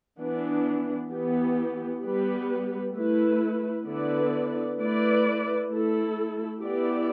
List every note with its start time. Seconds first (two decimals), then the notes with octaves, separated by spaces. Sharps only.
0.19 E3 B3 D4
1.11 E3 B3 G4
2.02 G3 B3 G4 B4
2.93 A3 E4 B4
3.86 D3 B3 E4 B4 D5
4.78 A3 E4 B4 D5
5.69 A3 E4 A4
6.61 B3 E4 G4 D5